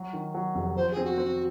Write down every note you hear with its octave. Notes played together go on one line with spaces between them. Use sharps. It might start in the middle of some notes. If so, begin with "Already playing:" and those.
Already playing: F#3
D#3
F#3
F1
F3 C5
G#4
C4
F#4
C4